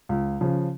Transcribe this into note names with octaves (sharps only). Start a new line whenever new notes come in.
C#2
C#3 F3